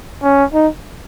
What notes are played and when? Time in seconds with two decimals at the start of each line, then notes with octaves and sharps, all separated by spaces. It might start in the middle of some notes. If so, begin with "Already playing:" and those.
0.23 C#4
0.54 D#4